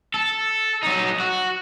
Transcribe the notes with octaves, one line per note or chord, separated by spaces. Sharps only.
A4
F#3 D#4
F#4